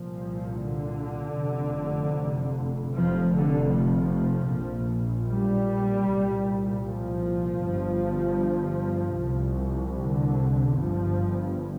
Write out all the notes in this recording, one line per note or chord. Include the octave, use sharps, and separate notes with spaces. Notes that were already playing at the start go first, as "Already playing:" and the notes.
Already playing: C2 A#2 F3
D3
F1 F2 C3
F1 F2 C3 F3
D3
F3
A#1 A#2
G3
C2 A#2
F3
G1 G2
C2 C3
D3
G1 G2 F3